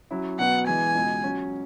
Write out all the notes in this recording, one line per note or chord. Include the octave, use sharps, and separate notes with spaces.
F#3 C#4 E4
B2 F#3 B3 F#5
E3 G#3 B3 G#5
C#2 B2 G#3
F#3 C#4 F#4